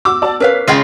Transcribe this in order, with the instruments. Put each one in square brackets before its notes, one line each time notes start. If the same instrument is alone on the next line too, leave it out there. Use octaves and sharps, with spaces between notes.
[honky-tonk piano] F#4 D6 E6
F#4 D5 A5
[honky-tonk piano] C#4 B6 [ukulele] A#4 B4 F5
[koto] C#3 G#3 F4 [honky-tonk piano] D#5 G5